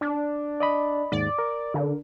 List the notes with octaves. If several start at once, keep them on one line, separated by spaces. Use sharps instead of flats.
D4
D5 D#5 B5
D#2 G#2 D5
A#4
D3